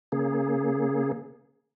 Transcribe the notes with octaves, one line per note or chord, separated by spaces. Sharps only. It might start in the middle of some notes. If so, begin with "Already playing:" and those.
C#3 A#3 G#4